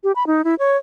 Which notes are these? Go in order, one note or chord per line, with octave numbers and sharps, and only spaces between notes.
G4
B5
D#4
E4
C#5